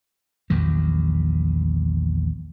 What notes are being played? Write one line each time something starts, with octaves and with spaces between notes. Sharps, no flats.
A#1 E2 D#3 F#3